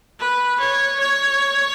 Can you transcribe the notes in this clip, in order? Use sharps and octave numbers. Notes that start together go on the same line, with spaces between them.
B4
C#5
C#5